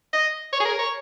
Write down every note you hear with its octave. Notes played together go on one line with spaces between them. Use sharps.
D#5
C#5
G#4
A#4
C#5